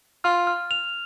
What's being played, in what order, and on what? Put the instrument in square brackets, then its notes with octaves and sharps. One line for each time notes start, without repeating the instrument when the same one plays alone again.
[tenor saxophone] F4 [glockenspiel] F6
[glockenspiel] F6
F7